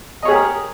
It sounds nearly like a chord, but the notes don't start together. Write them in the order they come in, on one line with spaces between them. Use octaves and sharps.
D#5 C#5 G#4 G4 A#4